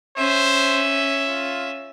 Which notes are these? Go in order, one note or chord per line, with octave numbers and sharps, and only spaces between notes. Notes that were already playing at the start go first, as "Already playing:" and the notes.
C#4 C5 E5
F4